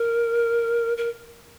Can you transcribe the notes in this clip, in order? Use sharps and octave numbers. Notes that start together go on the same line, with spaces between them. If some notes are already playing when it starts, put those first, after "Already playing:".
Already playing: A#4
A#4